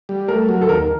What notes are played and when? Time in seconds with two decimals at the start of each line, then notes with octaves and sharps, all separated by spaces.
0.09 G3
0.28 A3 A#4
0.49 F#3
0.62 A4
0.69 D#2 A#4